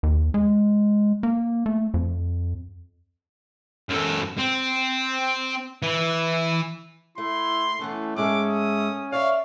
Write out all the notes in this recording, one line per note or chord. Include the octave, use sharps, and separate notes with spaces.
D#2
G#3
A#3
A3
F2
F#2 A4
C4
E3
A3 E4 C6
E3 A3 B3 C#4
G#2 G#3 C#4 A4 E5 D6
D#6
C#5 D5 E5 F5